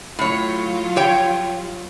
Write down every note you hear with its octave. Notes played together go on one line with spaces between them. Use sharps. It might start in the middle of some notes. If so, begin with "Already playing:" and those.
A2 F#3 F4 C#5
G4 C#5 G5